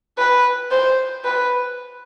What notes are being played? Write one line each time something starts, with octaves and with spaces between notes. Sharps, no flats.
B4
C5
B4